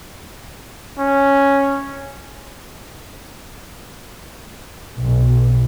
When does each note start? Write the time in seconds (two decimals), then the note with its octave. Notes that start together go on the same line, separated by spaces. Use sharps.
0.99 C#4
4.98 B1